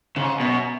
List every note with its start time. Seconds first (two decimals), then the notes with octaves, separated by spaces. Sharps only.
0.16 G#2 C#3
0.40 F#2 B2